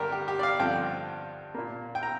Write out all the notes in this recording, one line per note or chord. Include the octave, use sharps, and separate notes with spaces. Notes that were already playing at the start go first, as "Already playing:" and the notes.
Already playing: G2 D3 G3 A#3 G4 A#4
G4
G4
D5
F5
G2 D3 F3 C4 G5
A#2 A#3
G5
A#5